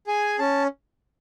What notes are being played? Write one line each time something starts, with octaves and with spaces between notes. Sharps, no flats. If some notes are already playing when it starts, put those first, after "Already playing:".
G#4 G#5
C#4 A5